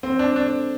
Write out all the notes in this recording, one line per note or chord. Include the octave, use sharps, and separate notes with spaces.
C4
D4
D4